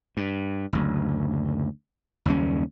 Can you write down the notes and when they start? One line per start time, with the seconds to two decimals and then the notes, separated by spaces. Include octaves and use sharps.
0.17 G2
0.73 F#1 D2
2.26 F#1 D#2 G3 C#4